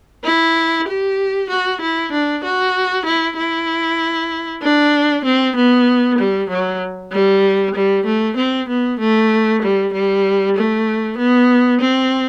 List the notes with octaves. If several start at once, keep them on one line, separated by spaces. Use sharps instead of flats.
E4
G4
F#4
E4
D4
F#4
E4
E4
D4
C4
B3
G3
F#3
G3
G3
A3
C4
B3
A3
G3
G3
A3
B3
C4